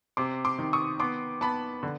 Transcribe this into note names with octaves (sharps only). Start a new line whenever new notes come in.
C3 C6 D6
C6 D6
D#3
C#6 D#6
B3 C6 D6
B3 A5 B5
D3